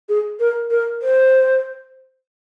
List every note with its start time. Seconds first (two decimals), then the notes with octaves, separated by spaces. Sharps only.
0.09 G#4
0.40 A#4
0.70 A#4
1.02 C5